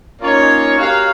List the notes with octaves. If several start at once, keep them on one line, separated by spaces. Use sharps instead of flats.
A#3 C#4 D#4 F4 C#5
F#4 G4 A#4 C#5 F5